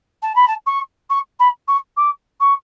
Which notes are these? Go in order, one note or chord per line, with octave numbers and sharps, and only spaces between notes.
A5
B5
A5
C#6
C#6
B5
C#6
D6
C#6